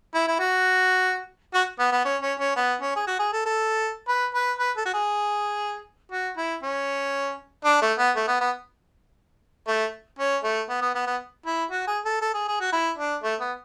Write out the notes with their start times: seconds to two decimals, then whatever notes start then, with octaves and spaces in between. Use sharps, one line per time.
0.15 E4
0.28 E4
0.39 F#4
1.54 F#4
1.79 B3
1.92 B3
2.05 C#4
2.22 C#4
2.39 C#4
2.56 B3
2.82 C#4
2.96 G#4
3.07 F#4
3.19 G#4
3.33 A4
3.46 A4
4.08 B4
4.34 B4
4.59 B4
4.77 A4
4.86 F#4
4.94 G#4
6.12 F#4
6.37 E4
6.63 C#4
7.65 D4
7.82 A3
7.99 B3
8.16 A3
8.28 B3
8.41 B3
9.68 A3
10.19 C#4
10.44 A3
10.69 B3
10.82 B3
10.95 B3
11.07 B3
11.46 E4
11.71 F#4
11.88 G#4
12.05 A4
12.22 A4
12.34 G#4
12.48 G#4
12.60 F#4
12.73 E4
12.98 D4
13.23 A3
13.41 B3